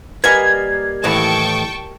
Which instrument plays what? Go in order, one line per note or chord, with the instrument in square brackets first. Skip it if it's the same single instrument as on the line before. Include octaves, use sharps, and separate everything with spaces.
[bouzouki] G3 A#3 D#5 [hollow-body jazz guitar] B4 F#5 G#5 [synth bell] G#6
[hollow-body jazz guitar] D#2 A2 E3 [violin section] G5 A5 C#6